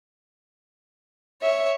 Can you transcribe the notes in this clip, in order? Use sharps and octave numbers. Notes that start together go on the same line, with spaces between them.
C#5 E5